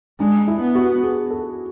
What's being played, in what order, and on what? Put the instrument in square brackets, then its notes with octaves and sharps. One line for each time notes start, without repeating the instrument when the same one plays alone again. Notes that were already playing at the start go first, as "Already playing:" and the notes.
[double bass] G#3 [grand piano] D4
[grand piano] E4
[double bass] B3
[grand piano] F#4
G#4
A4